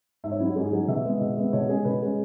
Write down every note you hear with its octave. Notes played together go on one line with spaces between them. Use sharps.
G#2 E5
C#5
F#3 C#4 E4
F#4
G#2 G#4
F#3 C#4 G#4
B2 E5
G#3 B3
B2
G#3 B3
B2 C#5
G#3 C#4 G#4
B2 B4
G#3 C#4 G#4